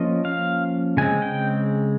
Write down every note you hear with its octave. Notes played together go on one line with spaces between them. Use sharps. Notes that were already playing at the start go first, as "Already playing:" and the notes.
Already playing: F3 A#3 C#4 D#5
F5
C#3 G#3 C4 G#5
G5